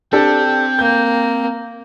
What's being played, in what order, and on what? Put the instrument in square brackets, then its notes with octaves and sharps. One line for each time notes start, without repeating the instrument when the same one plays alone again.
[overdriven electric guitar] C4 [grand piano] D4 G4 A4 [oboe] G5
[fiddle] A#3 [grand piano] G6